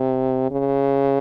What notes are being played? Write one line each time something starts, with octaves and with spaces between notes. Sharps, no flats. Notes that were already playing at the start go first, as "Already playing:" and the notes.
Already playing: C3
C#3